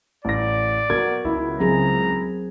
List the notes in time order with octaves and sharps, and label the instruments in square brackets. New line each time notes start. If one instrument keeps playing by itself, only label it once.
[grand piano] A1 A#6 [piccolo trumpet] D5
[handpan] B3 F#4 A#4 [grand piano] G#6
[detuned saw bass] C#2 [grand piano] E4
[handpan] F#3 C4 G#4 [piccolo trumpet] A#5